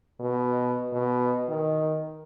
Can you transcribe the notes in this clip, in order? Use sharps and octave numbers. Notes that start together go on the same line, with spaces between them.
B2
B2
D#3